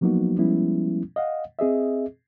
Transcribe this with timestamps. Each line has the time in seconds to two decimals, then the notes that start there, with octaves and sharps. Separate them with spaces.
0.01 F3 F#3 A#3 B3 D#4 F#4
0.37 F3 G3 G#3 B3 C#4 E4
1.16 D#5 F5 F#5
1.59 C4 G#4 D#5 E5